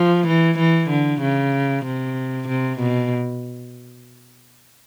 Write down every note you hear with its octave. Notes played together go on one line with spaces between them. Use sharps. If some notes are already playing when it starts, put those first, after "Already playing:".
Already playing: F3
E3
E3
D3
C#3
C3
C3
B2